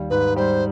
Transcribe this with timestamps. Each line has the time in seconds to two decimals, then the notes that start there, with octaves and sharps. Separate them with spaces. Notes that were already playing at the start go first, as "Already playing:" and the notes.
Already playing: D#2 G3
0.10 G#2 B4
0.36 G3 C5